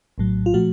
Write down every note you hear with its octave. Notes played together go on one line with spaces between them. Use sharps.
A#1 A2 F#3
F4
A#2 F3 A3 F#4